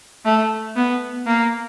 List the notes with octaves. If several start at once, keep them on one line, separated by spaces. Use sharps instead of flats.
A3
B3
A#3